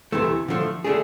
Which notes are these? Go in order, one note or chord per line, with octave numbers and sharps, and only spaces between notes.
D2 C3 E3 A3
D3 F3 A3
D3 A3 D4 G#4